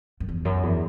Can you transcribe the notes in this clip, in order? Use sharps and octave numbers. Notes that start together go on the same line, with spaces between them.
F#2
E2
F#2
E2